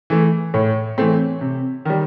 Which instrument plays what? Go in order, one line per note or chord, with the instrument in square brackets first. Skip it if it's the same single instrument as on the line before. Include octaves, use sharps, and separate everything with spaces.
[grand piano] E3 A3
A2 C#5
E3 A3 C4
C3
D#3 G3